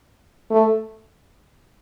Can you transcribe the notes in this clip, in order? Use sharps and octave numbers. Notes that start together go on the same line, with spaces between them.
A3